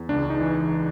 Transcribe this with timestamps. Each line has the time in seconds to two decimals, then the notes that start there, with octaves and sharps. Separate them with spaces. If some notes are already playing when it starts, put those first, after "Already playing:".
Already playing: E2
0.09 C#2 D4
0.30 D#4
0.41 E3